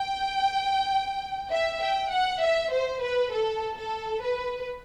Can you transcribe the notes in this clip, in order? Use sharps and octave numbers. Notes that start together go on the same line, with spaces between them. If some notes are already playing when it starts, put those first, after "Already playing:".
Already playing: G5
E5
G5
F#5
E5
C5
B4
A4
A4
B4